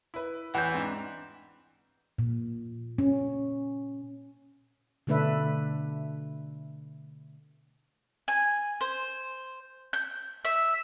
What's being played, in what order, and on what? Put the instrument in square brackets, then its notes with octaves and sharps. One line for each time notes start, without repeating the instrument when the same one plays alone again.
[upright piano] E4 B4
[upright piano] A1 E2 [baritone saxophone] E3 [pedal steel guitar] F#5 G6
[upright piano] G#2 [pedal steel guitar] C4 D4
[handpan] A#2
C#4
B2 D3 A3 D4 B4 E5
[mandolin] G#5
C5
G6
E5